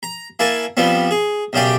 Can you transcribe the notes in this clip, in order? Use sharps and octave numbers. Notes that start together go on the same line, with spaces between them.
A#5
A#3 E4 G#5 A5
F3 G3 B3 C4
G#4
B1 F#2 C#3 G4 D5 G5